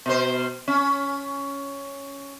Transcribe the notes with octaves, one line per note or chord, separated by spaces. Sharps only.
B2 C5
C#4